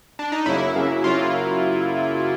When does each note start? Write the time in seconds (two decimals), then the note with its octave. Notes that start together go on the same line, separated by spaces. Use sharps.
0.19 D4
0.32 D#4
0.46 F#2 C#3 F#3 A#3 E4
0.75 F#2 C#3 F#3 A#3
1.04 F#2 C#3 F#3 A#3 F4